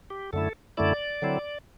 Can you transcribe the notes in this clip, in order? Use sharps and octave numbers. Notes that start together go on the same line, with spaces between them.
G4
F#2 D3 A3 E4 A4
F#2 D3 A3 E4 D5
D3 F#3 C4 E4